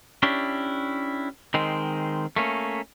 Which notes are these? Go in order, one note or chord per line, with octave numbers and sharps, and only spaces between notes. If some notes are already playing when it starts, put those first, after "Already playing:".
C#4 D4 E4 G4
D#3 G#3 C4
A3 A#3 C#4